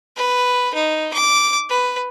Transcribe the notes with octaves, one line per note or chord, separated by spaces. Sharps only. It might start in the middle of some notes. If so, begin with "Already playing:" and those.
B4
D#4
D6
B4